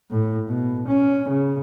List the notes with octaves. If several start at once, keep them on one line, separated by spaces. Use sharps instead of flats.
A2
B2
C#4
C#3